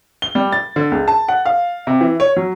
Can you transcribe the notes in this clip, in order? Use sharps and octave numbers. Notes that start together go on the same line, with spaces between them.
G7
G3
A6
D3
C#2
A5
F#5
F5
C3
E3
C#5
F#3